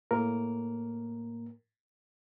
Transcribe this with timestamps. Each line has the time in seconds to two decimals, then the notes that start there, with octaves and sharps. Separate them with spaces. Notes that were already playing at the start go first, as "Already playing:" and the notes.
0.11 A2 A#3 A#4